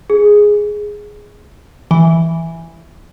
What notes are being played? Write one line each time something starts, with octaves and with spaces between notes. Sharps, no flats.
G#4
E3